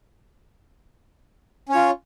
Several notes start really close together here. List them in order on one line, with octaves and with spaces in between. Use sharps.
C#4 C#5 F4